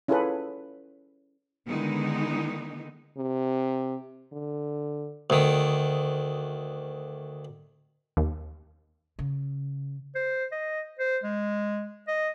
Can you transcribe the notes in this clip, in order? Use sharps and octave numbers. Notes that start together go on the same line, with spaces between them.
C#4 E4 F4 G#4 A4 B4
D3 D#3 G#3 B3 D#4 E4
C3
D3
D2 D#3
D#2
C#3
C5
D#5
C5
G#3
D#5